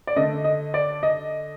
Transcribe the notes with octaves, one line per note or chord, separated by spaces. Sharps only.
D5
D3 A3 D#5
D#5
D5
D#5